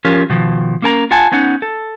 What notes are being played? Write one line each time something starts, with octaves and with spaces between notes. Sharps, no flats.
F3 C#4 F4 G4 A#4
B2 D#3 F3
A#3 C#4 A#4 A5 A#5
F4 F#5 G#5 A5
B3 C#4 D#4 F#5
A4